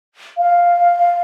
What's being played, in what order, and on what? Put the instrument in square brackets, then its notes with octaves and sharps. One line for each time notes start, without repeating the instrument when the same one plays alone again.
[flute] F5